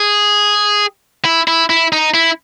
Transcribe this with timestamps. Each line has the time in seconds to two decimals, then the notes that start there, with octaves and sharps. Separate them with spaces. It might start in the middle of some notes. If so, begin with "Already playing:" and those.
Already playing: G#4
1.25 E4
1.48 E4
1.70 E4
1.93 D#4
2.14 E4